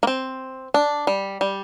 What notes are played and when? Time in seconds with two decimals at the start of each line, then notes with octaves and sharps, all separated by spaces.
0.03 A#3
0.07 C4
0.74 D4
1.07 G3
1.41 G3